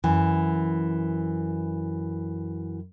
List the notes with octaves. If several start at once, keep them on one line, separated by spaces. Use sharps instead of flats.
F#2 E3